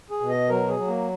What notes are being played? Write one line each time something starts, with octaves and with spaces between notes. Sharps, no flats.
G#4
B2
D#5
F#3 A#4
G#4
F#3
A#3